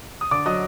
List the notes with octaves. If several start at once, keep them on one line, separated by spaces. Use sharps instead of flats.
D#6
D3 D5 D6
F#3 D#5 D#6